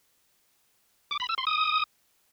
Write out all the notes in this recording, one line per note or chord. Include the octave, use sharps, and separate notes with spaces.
D6
B5
E6
C6
D#6